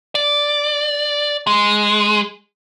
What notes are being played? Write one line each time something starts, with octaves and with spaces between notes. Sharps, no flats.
D5
G#3